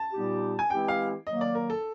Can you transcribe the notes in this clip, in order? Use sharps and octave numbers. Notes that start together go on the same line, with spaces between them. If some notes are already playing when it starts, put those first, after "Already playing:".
Already playing: A5
A#2 G3 B3 D#4 G4
G#5
E3 G#3 C4 E4 G4 G5
F5
D#3 F#3 A#3 D#5
D5
A#4
A4